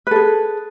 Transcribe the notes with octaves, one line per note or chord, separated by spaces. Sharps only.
G#4 A4 B4